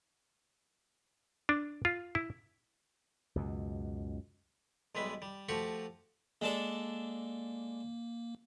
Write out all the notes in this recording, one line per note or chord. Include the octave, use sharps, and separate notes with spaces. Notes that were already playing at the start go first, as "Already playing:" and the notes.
D4
F4
E4
C#2 F#2 B2
B1 G3 G#3 B4 E5
G3
F3 A3 F#4 G4 F#5 C#6
G#3 A#3 D4 A4